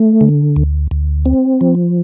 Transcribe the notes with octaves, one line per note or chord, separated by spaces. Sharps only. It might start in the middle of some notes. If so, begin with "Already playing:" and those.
Already playing: A3
D3
D2
D2
C4
F3